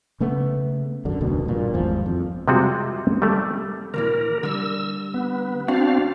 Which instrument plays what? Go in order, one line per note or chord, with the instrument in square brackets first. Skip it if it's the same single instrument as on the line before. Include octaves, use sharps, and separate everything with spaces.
[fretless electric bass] C#3 A3 B3
F#2 D3
F1 D2 B2 D#3
G2 A#2
G#1 E2 G#2 F3
F2
[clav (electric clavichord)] C3 G3 G#3 C4 F4 F#4
G3 A3
[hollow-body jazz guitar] D2 A#2 E3 [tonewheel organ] A#4
[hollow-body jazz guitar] D3 G3 [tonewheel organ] E6
[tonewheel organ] B3
[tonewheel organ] C4 D4 F5 [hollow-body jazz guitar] F#4